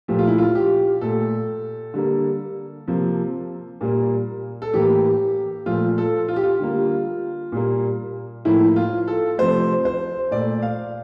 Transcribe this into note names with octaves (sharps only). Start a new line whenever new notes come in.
A#2 F3 A3 G4
F4
E4
F4
G4
A#2 A3 A4
D3 G3 A#3
C3 F3 A#3
A#2 G3 A#3
A4
A2 E3 A#3 G4
A#2 F3 A3 F4
A4
F4
G4
F4
D3 G3 A#3
A#2 G3 A#3
A2 F3 A#3 E4
F4
A4
C3 F3 A3 C5
C5
A#2 A3 D5
F5